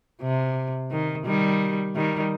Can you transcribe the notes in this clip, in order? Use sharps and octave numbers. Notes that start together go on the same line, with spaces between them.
C3
D#3
D#3 G3
D#3 G3